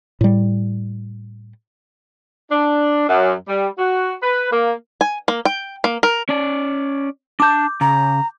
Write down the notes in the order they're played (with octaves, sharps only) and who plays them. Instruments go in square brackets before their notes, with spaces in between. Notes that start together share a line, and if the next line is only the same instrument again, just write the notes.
[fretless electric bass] A2 G3
[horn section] D4
F#2
G3
F#4
B4
A#3
[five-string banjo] G#5
A#3
G5
A#3
A#4
[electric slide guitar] C#4 D5
[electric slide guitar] D4 A5 [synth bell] D6 G6
[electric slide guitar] C#3 [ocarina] A#5